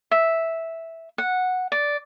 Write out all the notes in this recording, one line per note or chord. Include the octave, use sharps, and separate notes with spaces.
E5
F#5
D5